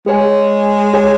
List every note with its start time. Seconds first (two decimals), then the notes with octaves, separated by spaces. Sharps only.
0.06 G#3 G#4 C#5 G#5
0.94 G#4 C#5 G#5